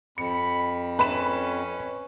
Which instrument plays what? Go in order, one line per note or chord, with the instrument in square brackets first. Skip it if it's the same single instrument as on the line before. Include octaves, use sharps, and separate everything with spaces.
[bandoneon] F2 [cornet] B5 [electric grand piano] C#7
[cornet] C#4 [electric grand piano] B4 [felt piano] B5 E7